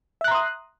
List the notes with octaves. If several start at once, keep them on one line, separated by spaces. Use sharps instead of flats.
E5 A#5 C6 D#6 F#6